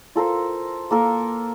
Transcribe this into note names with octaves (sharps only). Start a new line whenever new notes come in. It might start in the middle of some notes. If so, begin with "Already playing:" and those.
F4 A4 A#4 C5
A#3 A4 A#4